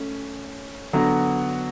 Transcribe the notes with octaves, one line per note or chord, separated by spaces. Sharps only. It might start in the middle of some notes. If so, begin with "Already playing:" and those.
Already playing: A3 C#4
D3 F#3 B3 F#4